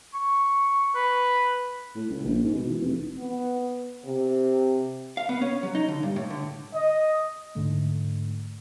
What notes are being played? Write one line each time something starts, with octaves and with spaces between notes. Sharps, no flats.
C#6
B4
A2
C#2
A#1
G#2
B2
E3
F1
B3
C3
F5
B3
C#4
F#3
D#4
D3
G2
A2
D3
D#5
G#2 D3 A3